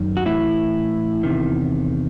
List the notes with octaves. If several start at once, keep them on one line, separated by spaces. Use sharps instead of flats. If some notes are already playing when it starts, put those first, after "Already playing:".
Already playing: F#2 D#3
F#4
A2 E3 E4
E2 C3 D#3